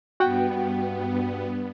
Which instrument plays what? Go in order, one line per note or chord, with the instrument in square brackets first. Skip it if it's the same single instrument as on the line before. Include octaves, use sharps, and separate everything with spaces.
[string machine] G2 B3 [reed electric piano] F#4 F#5 G5